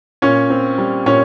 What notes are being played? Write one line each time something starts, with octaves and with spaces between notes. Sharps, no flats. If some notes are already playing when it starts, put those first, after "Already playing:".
A#2 C#4 C#5
C4
G3
A#2 C#4 C#5